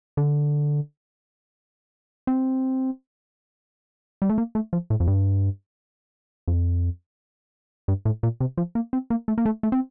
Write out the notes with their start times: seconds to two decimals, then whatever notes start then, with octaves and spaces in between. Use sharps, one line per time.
0.17 D3
2.27 C4
4.22 G3
4.29 A3
4.38 A#3
4.55 A3
4.73 F3
4.90 A2
5.00 F2
5.07 G2
6.48 F2
7.88 G2
8.05 A2
8.23 A#2
8.40 C3
8.58 F3
8.75 A#3
8.93 C4
9.10 A#3
9.28 A3
9.38 A#3
9.46 A3
9.63 A3
9.72 C4